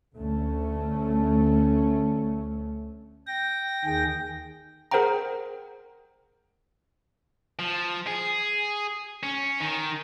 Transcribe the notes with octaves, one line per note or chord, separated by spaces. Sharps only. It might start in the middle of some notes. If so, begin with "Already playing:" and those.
D2 A3 C#4
G5 A#6
D#2 D#3 G#4 G5 A#6
G#4 A#4 C5 F#5 G5 A#5
F3
G#4
C#4
D#3